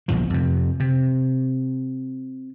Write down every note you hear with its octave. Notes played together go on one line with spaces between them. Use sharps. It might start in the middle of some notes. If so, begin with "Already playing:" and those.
A#1 E2 G2 F3
F2 C3
C3